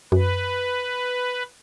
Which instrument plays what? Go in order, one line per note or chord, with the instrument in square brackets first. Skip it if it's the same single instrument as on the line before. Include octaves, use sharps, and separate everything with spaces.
[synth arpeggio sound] F#2 [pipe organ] B4